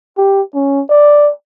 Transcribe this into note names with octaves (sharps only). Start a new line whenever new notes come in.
G4
C#4
D5